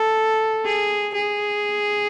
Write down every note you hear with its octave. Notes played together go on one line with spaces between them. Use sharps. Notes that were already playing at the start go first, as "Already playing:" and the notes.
Already playing: A4
G#4
G#4